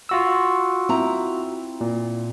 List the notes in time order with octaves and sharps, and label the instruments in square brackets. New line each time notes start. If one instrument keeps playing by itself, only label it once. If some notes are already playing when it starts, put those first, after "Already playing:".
[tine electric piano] F4 F#4 E6
[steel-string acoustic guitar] C4 E4 A#5
[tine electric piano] A#2